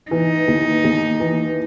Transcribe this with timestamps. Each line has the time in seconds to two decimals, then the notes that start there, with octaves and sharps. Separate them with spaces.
0.11 E3 D#4
0.48 D#2
0.84 D#2
1.20 E3